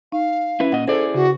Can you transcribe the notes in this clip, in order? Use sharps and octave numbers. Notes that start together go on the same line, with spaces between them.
D#4 F5
C#4 E4 B4
A#2 D#5 F#5
E4 G#4 A4 C5 D5
C#3 F#4